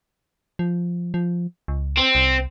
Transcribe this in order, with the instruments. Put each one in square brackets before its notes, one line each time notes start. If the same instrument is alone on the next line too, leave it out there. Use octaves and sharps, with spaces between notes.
[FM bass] F3
F3
C#2
[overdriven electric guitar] C4
[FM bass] C2